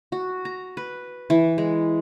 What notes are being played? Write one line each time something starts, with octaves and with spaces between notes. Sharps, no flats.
F#4
A#5
B4
E3
G#3